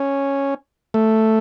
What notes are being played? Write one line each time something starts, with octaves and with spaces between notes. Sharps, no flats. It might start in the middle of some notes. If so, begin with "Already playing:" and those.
Already playing: C#4
A3